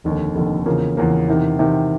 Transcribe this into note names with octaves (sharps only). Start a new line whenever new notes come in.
F1 D#2 D3
F1 D#2 D3
E2 C#3 F3 A#3
E2 C#3 F3 A#3
E2 C3 D#3
E2 C3 D#3